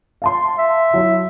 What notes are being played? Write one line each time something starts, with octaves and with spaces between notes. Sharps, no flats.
F5 A5 C6
E5
F#3 E4